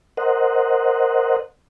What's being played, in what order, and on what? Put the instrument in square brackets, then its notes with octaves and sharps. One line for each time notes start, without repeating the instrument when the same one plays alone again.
[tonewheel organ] A#4 C5 D#5 F#5